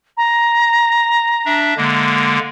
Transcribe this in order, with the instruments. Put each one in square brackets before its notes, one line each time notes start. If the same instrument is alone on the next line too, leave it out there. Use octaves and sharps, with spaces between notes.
[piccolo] A#5
[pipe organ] D4 E5
D3 G#3 A#3